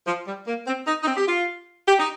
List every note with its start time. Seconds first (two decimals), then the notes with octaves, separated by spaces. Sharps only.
0.05 F3
0.25 G3
0.45 A#3
0.65 C4
0.85 D#4
1.02 D#4
1.05 C4
1.17 G4
1.26 F4
1.86 G4
1.98 D#4